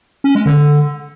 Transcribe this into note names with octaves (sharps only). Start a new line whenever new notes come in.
C#4
G#3
D3